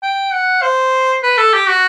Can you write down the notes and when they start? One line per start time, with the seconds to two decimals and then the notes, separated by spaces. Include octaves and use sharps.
0.03 G5
0.32 F#5
0.62 C5
1.24 B4
1.38 A4
1.54 G4
1.68 F#4